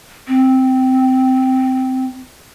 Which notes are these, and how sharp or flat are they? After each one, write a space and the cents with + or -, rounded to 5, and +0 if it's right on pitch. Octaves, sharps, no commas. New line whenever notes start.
C4 -10